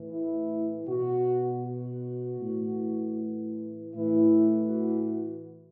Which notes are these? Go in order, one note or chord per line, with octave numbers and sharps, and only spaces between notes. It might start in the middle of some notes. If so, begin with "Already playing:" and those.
Already playing: A2 E3
E4
B2 F#4
F#4
A2 E3
A2 E3 E4
F#4